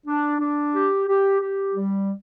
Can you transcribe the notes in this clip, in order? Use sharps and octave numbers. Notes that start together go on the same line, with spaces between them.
D4
D4
G4
G4
G4
G3